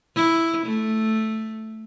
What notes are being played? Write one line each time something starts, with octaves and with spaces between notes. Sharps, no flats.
E4
A3